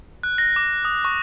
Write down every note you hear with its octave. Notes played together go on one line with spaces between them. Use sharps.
F#6
A#6
D6
D#6
C#6